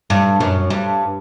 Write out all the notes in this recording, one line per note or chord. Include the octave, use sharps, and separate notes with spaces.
G2
F#2
G2